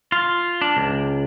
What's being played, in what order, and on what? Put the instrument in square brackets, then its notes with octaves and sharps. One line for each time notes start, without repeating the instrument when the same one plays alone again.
[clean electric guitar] F4
D4
C#2